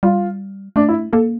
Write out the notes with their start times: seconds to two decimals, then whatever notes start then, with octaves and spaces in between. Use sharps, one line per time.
0.03 G3 F4
0.76 A3 D4
0.89 E4
1.13 A#3 A4